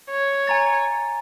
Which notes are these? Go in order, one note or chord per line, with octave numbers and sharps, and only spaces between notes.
C#5
G#5 A#5 A6